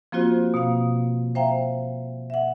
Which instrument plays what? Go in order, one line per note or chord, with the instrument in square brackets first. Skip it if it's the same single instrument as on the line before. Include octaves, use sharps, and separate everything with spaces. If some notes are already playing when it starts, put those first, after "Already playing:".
[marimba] F3 A#3 C4 F4 F#4 C5
B2 A#3 F5
C5 E5 F5 G5 A#5
E5 F#5